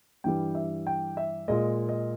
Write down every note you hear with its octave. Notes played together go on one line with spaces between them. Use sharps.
G2 E3 G3 G5
E5
G5
E5
A#2 G#3 D#5
D#5